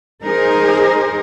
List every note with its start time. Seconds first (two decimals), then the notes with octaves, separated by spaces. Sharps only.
0.22 D#4 G#4 A#4 C5